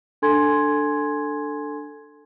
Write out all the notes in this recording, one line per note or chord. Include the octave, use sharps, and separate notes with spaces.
D4 A4 G#5 C6 G#6